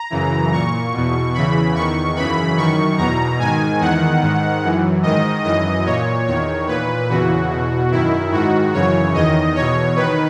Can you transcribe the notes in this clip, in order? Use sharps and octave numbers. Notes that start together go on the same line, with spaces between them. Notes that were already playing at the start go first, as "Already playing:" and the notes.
Already playing: A#5
F#2 C#3 E3
A#2 C#6
E2 B2
E2 C#3 E3 B5
E2 D#3 C#6
F#2 C#3 E3 B5
F#2 D#3 C#6
E2 B2 A#5
G#2 D#3 G#5
E2 D#3 F#5
G#2 D#3
F#2 E3
G#2 D#3 D#5
F#2 E3 D#5
A#2 C#5
E2 D#3 C#5
A#2 B4
E2 C#3 E3 F#4
E2 B2
F#2 D#3 E4
G#2 D#3 F#4
F#2 C#3 E3 C#5
E2 D#3 D#5
E2 B2 C#5
D#3 B4